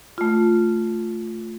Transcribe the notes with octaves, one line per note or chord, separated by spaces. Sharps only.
A3 F4